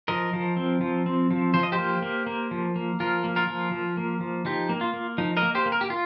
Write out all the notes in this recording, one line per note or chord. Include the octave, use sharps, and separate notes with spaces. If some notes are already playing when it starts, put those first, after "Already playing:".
F3 A#4 D#5
F3
C4
F3
C4
F3
F3 C5
D#5
G4 C5
A#3
A#3
A#3
F3
A#3
F3 F4 A#4
A#3
F4 A#4
F3
F3
A#3
F3
F3 D#4 G4
A#3
F4
A#3
F3 D#4
A#4 D#5
A#3
G4 C5
A#3
A#4
G4
F4